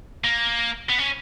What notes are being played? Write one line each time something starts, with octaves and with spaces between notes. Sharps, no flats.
A#3
B3
C#4